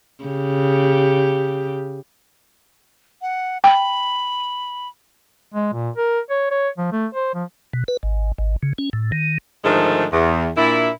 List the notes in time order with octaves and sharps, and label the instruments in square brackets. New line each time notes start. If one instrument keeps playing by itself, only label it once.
[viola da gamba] C#3 G4
[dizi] F#5
[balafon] G5 [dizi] B5
[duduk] G#3
A#2
A#4
C#5
C#5
F3
A3
C5
F3
[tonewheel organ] B2
B4
G#1
G#1
C#3
C#4
A2
D#3
[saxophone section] G#2 D3 D#3 F3 G#3 A3
E2
A#2 D4 E4